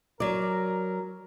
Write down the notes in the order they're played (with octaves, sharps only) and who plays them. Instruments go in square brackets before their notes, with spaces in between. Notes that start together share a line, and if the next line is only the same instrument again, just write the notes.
[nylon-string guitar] F#3 D5 [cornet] A#4